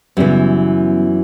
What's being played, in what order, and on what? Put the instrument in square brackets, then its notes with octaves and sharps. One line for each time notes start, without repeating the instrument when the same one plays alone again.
[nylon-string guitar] F#2 E3 [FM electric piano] C#3 G3 B3